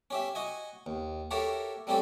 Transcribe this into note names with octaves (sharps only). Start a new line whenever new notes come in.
C#4 G4 E5
F#4 D#5 G#5
D#2
F#4 G4 A4 A#4 C#5 E5
G3 A3 C4 C#4 G4 A4